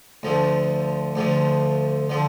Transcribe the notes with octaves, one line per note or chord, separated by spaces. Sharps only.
D2 D3 F3
D2 D3 F3
D3 F3